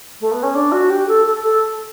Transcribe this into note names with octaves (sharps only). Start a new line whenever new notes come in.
A3
B3
C#4
D4
F#4
G4
A4
A4
A4